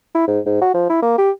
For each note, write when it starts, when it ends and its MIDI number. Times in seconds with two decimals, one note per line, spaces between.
0.15 0.27 64
0.28 0.40 44
0.46 0.58 44
0.61 0.74 66
0.74 0.88 53
0.90 1.01 64
1.02 1.13 58
1.18 1.31 67